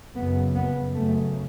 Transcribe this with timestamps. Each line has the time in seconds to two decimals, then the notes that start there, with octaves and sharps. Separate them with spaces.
0.15 F#2 C#3 B3
0.54 B3
0.94 F#2 C#3 A3